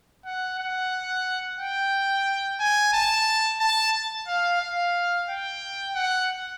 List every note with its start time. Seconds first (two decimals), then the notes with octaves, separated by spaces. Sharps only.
0.25 F#5
0.58 F#5
1.59 G5
2.60 G#5
2.94 A5
3.60 A5
4.28 F5
4.62 F5
5.28 G5
5.95 F#5